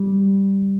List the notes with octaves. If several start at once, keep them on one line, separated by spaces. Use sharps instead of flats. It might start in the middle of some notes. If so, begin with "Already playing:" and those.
Already playing: G3